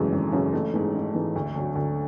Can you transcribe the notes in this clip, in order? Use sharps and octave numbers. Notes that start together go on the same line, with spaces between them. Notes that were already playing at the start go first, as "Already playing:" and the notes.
Already playing: G#1 F#2 C#3 E3 G#3 A3
G#1
F#2 C#3 E3
A1 A3
G#2 E3
A1
G#2 E3
D2
D3 F#3
D2